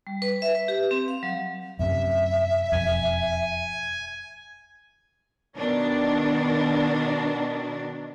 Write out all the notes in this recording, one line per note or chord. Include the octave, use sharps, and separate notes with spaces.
G3
B4
E5
B4
G4
C4
F5
F#3
F#2 C3 E5
E1 F2 G#5
B2 D#3 D4